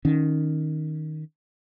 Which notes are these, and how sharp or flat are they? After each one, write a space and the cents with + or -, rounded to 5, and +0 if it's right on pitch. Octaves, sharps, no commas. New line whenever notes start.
D#3 +0 C#4 +0